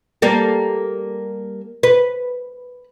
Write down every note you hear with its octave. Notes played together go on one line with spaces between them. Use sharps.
G3 A#3 A4
B4